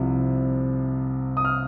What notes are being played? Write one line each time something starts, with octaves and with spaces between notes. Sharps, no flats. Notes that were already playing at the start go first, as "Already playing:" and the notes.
Already playing: C2 C3 F3
D#6
F6